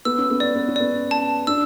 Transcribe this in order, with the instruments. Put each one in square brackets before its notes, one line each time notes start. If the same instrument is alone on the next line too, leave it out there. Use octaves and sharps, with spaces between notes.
[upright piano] B3 [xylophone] E6
[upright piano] C#4
B3
[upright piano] C#4 [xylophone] D5
[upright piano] B3
C#4
[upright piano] B3 [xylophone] D5
[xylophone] A5
[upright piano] D4 [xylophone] E6